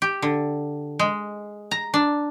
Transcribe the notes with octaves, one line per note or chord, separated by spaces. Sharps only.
G4
D3
G#3
A#5
D4